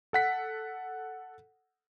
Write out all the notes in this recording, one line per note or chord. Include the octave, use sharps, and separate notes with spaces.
A4 F#5 B6